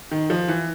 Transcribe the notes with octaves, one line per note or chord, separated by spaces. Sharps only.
D#3
F3
E3